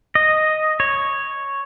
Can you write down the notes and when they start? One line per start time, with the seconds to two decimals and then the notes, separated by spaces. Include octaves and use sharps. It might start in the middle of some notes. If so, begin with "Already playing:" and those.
0.15 D#5
0.80 C#5